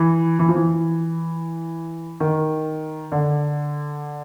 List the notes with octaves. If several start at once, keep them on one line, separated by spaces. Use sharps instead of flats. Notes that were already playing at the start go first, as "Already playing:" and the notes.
Already playing: E3
E3
F3
E3
D#3
D3